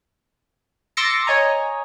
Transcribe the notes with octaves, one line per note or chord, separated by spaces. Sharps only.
C6 D6 E6 A6 A#6 C#7
C#5 D#5 G#5 A#5